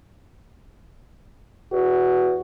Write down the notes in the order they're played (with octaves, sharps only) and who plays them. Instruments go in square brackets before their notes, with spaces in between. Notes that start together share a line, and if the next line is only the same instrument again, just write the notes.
[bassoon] E2 [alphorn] F#4